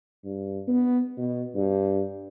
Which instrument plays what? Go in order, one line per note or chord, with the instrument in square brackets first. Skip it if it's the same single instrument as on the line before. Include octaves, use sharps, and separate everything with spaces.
[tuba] G2
B3
B2
G2